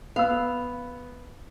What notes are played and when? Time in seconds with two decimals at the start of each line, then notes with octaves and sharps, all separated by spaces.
0.16 B3 B4 F5 E6